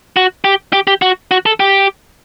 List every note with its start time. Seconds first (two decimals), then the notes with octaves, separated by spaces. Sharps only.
0.17 F#4
0.44 G4
0.73 G4
0.87 G4
1.02 F#4
1.31 F#4
1.46 A4
1.60 G4